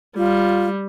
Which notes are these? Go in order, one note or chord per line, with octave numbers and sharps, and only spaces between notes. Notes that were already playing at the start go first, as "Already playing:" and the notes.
G3 F4